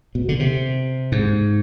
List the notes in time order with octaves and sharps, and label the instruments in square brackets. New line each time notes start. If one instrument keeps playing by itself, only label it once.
[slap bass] B2
D3
C3
G#2